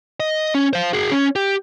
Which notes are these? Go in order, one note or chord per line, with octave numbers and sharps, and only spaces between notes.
D#5
C#4
C5 F5
F#4 G#4
C#4
G4